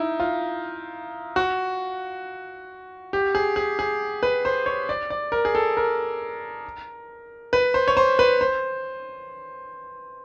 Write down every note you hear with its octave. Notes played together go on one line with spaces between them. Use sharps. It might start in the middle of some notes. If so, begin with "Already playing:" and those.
Already playing: D#4 E4
F4
F#4
G4
G#4
G#4
G#4
B4
C5
C#5
D5
D5
A#4
G#4
A4
A#4
B4
C5
C#5
C5
B4
C5